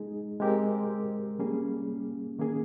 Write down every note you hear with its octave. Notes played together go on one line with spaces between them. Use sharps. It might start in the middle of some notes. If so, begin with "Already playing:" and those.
Already playing: G#3 D#4 G#4
G#3 C4 G4 A#4
G3 A#3 C#4 G#4
D#3 A#3 C#4 G#4